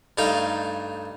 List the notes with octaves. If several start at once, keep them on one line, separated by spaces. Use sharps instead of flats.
G2 A3 D#4 F5 G5